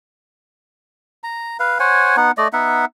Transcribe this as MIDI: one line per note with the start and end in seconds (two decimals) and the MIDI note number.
1.24 1.57 82
1.60 1.78 71
1.60 1.78 77
1.80 2.16 72
1.80 2.16 73
1.80 2.16 78
1.80 2.16 80
2.17 2.31 59
2.17 2.31 63
2.17 2.31 78
2.38 2.48 57
2.38 2.48 74
2.38 2.48 75
2.53 2.85 59
2.53 2.85 63
2.53 2.85 76
2.53 2.85 78